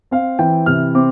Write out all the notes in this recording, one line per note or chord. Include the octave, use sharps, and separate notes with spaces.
C4 F5
E3 G5
C3 F6
C4 D6